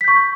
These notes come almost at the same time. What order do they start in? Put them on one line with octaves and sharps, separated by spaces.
B6 G6 C#6